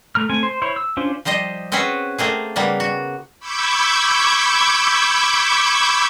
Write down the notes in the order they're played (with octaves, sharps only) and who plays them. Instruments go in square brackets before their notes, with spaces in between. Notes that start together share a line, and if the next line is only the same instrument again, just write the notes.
[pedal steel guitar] A3 A#5 F6
A3 C4 G#5
C5
E4 C5 C#5
E6
C#4 D4 F4 C5
[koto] F3 G3 C5 D#5
C4 C#4 F#4 G#4 B4
A3 A#3 C4 G#4
C#3 G3 A#3 B3
F#4
[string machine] B5 C#6 D6 E6 G6 G#6